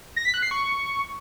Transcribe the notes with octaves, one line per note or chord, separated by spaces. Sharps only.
A#6
B6
F#6
C7
C#6